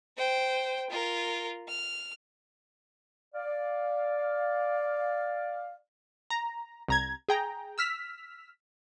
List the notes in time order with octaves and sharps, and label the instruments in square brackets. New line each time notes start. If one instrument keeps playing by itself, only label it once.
[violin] C5 G5
F4 A#4
F6
[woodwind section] D5 F5
[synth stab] A#5
C2 A#5 G#6
G#4 G5 A#5
E6 F6 B6